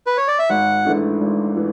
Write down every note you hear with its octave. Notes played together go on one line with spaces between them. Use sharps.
B4
C#5
D5
E5
G#1 F#5
G#2 E3 A3 D4
G#1
E3